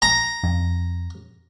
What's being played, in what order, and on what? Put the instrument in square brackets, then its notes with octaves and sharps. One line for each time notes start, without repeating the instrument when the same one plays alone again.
[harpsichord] A#5
[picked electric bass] F2